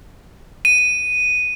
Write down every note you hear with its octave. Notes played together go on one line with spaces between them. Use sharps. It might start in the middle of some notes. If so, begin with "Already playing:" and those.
D#7
D#7